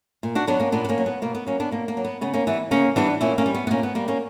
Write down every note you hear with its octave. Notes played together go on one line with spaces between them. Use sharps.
A#2
D4 F#4
F#3 B3 D4
A#3 C#4
A#2 B3 D4
D4
A#3 C#4
F#3
B3
B2 A#3
B3
F#3 A#3 C#4
B3 D4
B2 A#3
A#3
F#3
B3
C#3 B3
A#3 C#4
E3 G3 B3
C#3 A#3 C#4
E3 G3 B3 D4
A#2 C#4 E4
A#3 C#4
G3
B3
B3
A#2 A#3 C#4
B3
G3 A#3
A#3 C#4